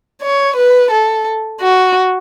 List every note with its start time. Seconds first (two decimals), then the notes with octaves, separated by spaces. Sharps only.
0.22 C#5
0.56 B4
0.91 A4
1.61 F#4